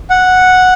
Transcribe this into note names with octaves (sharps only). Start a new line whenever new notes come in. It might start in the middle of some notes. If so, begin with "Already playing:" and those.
F#5